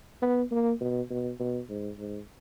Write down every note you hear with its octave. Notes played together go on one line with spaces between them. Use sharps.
B3
A#3
B2
B2
B2
G#2
G#2